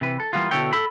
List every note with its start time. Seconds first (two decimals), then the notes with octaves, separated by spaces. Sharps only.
0.01 C3 E3 B4
0.20 A4
0.33 E3 G3 A#3 B3 F4
0.51 B2 D3 E4 A4 C#5 G5
0.73 A4 B5